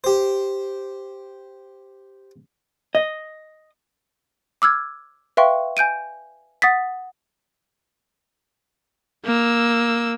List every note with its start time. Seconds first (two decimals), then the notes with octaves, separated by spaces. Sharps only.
0.04 G4 C5
2.95 D#5
4.62 D6 E6 F6 G#6
5.37 B4 E5 F5 G5 C6 C#6
5.77 G#5 G6 D7 D#7
6.62 F#5 D#6 A6 B6
9.25 A#3 E6